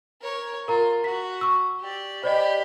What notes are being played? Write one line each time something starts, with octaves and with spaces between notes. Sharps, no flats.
A#4 C#5
F4 A#4 A#5
F#4 B6
C#6 E6
G4 D5
G4 C5 D5 D#5 B5